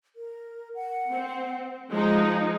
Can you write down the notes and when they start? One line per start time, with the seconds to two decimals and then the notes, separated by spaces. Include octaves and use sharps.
0.16 A#4
0.75 F#5
1.10 C4
1.91 F3 G#3 D#4 D#5